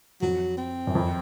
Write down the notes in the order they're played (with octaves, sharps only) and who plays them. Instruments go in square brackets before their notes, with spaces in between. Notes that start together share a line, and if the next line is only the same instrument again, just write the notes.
[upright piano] F2 [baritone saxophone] F#3
[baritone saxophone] C4
[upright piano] F#2
F2